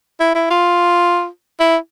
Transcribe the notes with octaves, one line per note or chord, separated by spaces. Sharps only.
E4
E4
F4
E4